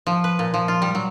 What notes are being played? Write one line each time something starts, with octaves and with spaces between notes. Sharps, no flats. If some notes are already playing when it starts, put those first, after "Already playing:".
F3
B4
A#2
F3
F4
G3
F#3